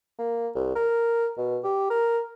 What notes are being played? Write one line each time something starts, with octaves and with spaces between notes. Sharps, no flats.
A#3
C2
A#4
B2
G4
A#4